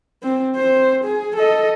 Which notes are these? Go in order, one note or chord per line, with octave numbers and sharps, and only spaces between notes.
C4
C4 C5
G#4
A4 D#5